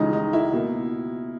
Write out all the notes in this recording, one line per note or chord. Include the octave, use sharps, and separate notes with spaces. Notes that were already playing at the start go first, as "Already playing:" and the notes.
Already playing: C#2 C#3 E3 G#3 D#4
D#4
E4
B2 A#3